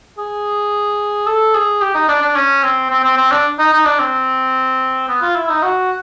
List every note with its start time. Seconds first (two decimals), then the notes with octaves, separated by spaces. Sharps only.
0.18 G#4
1.27 A4
1.55 G#4
1.82 G4
1.95 D#4
2.09 D4
2.22 D4
2.36 C#4
2.63 C4
2.91 C4
3.04 C4
3.18 C4
3.32 D4
3.59 D#4
3.73 D#4
3.86 D4
4.00 C4
5.09 B3
5.22 F4
5.36 E4
5.49 D#4
5.63 F#4